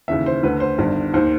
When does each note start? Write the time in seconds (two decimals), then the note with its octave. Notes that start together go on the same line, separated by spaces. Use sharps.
0.08 D#2 C#3 E3 E5
0.26 C5
0.43 D2 D3 B4
0.60 C5
0.79 G1 G2 D#3
1.14 D#2 D#3 C5